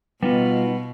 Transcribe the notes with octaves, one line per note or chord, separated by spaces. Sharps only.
B2 G3 B3 D#4 F4